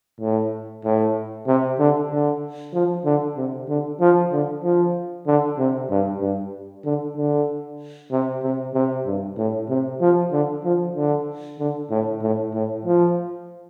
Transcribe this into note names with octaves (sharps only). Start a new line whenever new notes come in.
A2
A2
C3
D3
D3
F3
D3
C3
D3
F3
D3
F3
D3
C3
G2
G2
D3
D3
C3
C3
C3
G2
A2
C3
F3
D3
F3
D3
D3
A2
A2
A2
F3